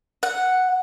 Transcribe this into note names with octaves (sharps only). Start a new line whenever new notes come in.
F#5